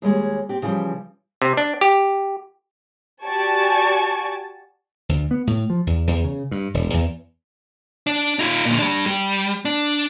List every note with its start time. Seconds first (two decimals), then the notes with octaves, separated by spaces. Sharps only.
0.02 D#2 G3 G#3 C#5
0.49 C4 G4
0.62 C#3 E3 F3 G3
1.42 C3
1.57 D4
1.81 G4
3.25 F#4 G4 D5 G#5 A5 C#6
5.09 D2
5.31 B3
5.47 A2
5.70 F3
5.87 E2
6.07 E2
6.24 C#3
6.51 G2
6.74 E1
6.94 E2
8.07 D4
8.39 D#4 F4
8.66 A#2 D3
8.79 G3 D4
9.06 G3
9.65 D4